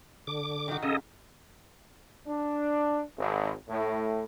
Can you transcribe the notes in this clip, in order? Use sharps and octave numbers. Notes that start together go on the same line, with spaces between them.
D3 D6
D#3 D#4 F#4
C#3 G#4 A4 D#5
D4
G#1
A2